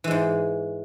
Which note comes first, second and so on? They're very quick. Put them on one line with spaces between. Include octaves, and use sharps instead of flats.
E3 G#3 G#2